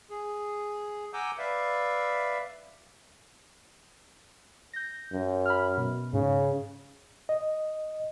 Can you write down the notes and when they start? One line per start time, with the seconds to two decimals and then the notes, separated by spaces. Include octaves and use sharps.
0.10 G#4
1.13 F#5 G#5 A#5 D6 E6 G6
1.38 B4 D5 E5 F5
4.73 G6 A#6
5.12 F#2
5.46 B5 F6
5.77 B2
6.13 G#2 C#3
7.29 D#5